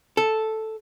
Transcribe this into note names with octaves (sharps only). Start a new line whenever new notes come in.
A4